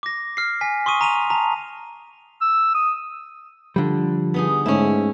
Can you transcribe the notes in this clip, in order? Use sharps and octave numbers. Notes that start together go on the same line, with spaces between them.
D6 A#6
F6 C7
G#5 B6
C6 C#6 D#6 D#7
A#5 D#7 F7
A5 A#5 F7
E6
D#6
D3 F3 G3
B3 D#4 G#4
G#2 A3 C#4 E4